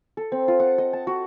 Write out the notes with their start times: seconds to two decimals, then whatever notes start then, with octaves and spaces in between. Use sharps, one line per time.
0.17 A4
0.32 C4
0.48 F4
0.60 F#5
0.78 D#5
0.93 A5
1.07 F#4